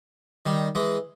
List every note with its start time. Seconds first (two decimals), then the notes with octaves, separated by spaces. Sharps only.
0.46 D#3 G3
0.75 E3 G#3